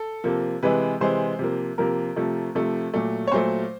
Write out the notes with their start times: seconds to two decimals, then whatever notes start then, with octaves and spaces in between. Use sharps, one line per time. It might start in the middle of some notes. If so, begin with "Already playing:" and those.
Already playing: A4
0.24 C3 F3 A#3
0.63 C3 E3 G#3 B4
1.01 C3 E3 G#3 C5
1.39 C3 F3 A#3
1.78 C3 F3 A#3 A#4
2.16 C3 F3 A3
2.55 C3 F3 A3
2.94 A#2 F#3 A3
3.28 C#5
3.32 A#2 F#3 A3 C5